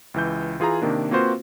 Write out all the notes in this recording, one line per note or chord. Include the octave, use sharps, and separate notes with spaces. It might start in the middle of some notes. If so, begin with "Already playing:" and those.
C#2 E3 G6
E3 F4 G#4 G#5 A#5
C3 D#3 A#3 D4
A#3 C4 F4 F#4 B4 C5